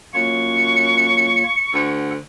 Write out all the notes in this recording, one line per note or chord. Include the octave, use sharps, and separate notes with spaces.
F#2 A#3 F4 C#5 C#6
D2 A4 F#5